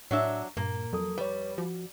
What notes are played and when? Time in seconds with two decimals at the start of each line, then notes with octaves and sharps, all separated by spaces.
0.11 A2 F#3 D4 C#5 E5
0.57 G2 A#2 A#3
0.93 F2 F#3 A4 D#6
1.18 G3 B4 C#5
1.58 F3 F#4